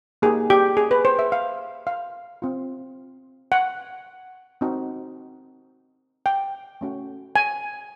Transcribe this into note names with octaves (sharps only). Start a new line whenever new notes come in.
A#3 D#4 G4 G#4
G4
G#4
B4
C5
E5
F5
F5
C4 F4
F#5
C4 D#4 F#4
G5
A3 C#4 F#4
G#5